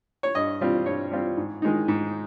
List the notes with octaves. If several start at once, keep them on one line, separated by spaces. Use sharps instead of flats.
C#5
G2 D#5
G3 C4 F4
G2 C#5
G3 C4 F4
G#2
D#3 G#3 D#4
G#2